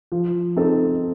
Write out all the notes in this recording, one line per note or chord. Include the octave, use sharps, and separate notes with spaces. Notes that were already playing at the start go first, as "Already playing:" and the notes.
F3
C4 D#4 A4